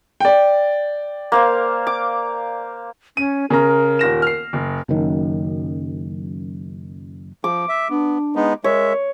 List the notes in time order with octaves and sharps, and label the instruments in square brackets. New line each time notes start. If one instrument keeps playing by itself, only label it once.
[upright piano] D5 G5
[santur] A#3 C5 F5
D6
[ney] C#4 [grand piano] D#7
[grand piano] C#3 A#5 [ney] A#4
[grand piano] D#1 A#6 E7
F6 C7
F#1
[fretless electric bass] F#1 F#2 D#3
[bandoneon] F3 [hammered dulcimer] D6
[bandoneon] E5
[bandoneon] B3 [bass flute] D4
[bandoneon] G#3 B3 D#4
[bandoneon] G#3 E5 [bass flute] A#4 [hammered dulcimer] C#5